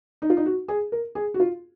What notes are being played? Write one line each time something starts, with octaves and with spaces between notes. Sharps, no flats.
D#4
F4
D#4
F#4
G#4
A#4
G#4
F#4
F4